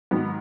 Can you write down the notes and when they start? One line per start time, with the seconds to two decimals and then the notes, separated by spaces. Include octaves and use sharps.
0.11 G#2 D#3 F#3 B3